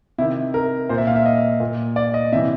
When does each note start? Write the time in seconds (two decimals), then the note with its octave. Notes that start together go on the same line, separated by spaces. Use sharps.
0.18 C3 D#3 E4
0.54 A#4
0.89 A#2 C5
0.98 E5
1.07 F5
1.16 E5
1.26 D#5
1.60 A#2
1.96 D5
2.14 D#5
2.32 C3 E5
2.35 E3